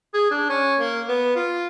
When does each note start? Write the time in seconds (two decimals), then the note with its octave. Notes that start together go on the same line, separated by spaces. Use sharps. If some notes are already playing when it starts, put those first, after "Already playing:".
0.14 G#4
0.31 D4
0.49 C#4
0.80 A#3
1.08 B3
1.36 F4